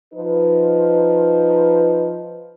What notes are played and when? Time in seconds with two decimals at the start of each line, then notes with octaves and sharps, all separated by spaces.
0.14 F3 D#4 B4